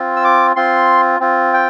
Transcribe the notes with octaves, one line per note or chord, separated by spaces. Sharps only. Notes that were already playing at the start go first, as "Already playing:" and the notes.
Already playing: C4 F4
E6
D6
C4 F4 C6
C4 F4
G5